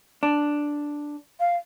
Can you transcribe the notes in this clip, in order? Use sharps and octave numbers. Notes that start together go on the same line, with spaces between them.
D4
F5